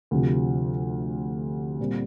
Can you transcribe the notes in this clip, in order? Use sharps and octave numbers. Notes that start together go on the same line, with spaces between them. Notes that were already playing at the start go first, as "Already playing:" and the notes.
D2 C3 F3
A#2 G3 C4